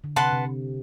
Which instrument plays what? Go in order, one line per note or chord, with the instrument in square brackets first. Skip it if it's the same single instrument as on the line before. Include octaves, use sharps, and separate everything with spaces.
[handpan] D3
[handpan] C3 [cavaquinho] B4 F#5 A5 C6
[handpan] C3